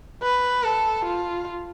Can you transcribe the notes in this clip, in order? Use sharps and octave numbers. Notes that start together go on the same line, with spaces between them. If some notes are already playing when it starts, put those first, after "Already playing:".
B4
A4
F4